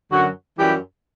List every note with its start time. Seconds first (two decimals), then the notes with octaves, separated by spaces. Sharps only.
0.11 F#2 D3 F#3 F#4
0.59 F#2 E3 G3 G4